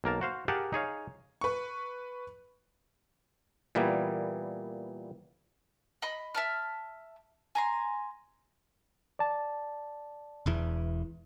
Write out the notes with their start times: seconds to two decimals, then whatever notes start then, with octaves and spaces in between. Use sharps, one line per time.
0.04 B1 A#3 A#4 A5
0.21 F#4 C5 F5
0.48 G4 G#4 A#4 F5 F#5 A5
0.73 D#4 G#4 C#5 F5
1.41 B4 C#6
3.75 A#2 E3 G3 A#3 B3
6.02 D#5 B5
6.35 E5 A5 F6
7.55 G#5 A#5 C6
9.19 D5 A5
10.46 E1 E2 E3